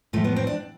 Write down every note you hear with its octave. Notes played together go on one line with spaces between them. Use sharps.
A2 F3 A3
B3
C4
D4